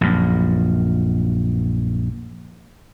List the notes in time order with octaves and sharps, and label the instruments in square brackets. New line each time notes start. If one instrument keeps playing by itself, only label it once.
[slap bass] A#1 F#2